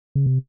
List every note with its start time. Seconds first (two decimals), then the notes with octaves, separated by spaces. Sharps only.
0.15 C#3
0.26 C3